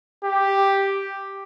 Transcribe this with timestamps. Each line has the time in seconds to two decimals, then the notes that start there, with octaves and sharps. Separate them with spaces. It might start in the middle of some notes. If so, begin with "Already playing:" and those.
0.24 G4